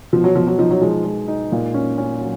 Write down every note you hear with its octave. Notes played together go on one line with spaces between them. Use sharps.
B2 F3
F#3
B2 F3
F#3
F3 D#4
F#3
F3 G#3
G#3
D#4
A#2
C#4
C#4
F#3